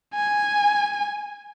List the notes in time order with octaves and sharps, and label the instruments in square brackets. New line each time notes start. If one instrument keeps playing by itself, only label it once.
[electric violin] G#5